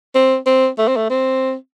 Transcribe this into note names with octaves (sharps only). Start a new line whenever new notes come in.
C4
C4
A3
C4
A3
C4